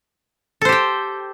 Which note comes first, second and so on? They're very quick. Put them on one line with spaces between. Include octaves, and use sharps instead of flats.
A4 C5 G4 G5